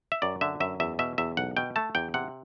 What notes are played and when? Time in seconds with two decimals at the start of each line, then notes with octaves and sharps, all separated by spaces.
0.12 E5
0.22 F#2 D5
0.41 D3 E5
0.60 F#2 E5
0.80 E2 E5
0.99 B2 E5
1.18 E2 E5
1.37 B1 F#5
1.57 B2 G5
1.76 A3 A5
1.95 E2 G5
2.14 C3 F#5